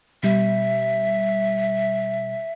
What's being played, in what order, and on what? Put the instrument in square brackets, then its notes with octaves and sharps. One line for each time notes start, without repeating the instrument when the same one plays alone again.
[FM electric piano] B2 G3 [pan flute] E5